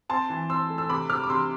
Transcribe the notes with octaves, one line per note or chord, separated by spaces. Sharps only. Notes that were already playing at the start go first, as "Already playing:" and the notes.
C4 A5 C6
E3
C4 C6 E6
A3
E6
C3 B5 D6
C3 D6 F6
D6
C3 C6 E6